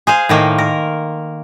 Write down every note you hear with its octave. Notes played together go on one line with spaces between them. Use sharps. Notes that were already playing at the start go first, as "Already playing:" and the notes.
G#4 C5 F5
A2 D#3 A#3
A#4